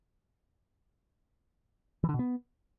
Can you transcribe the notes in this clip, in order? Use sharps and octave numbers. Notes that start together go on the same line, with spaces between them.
E3
D3
B2
B3